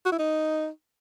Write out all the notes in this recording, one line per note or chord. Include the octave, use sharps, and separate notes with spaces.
F#4
E4
D#4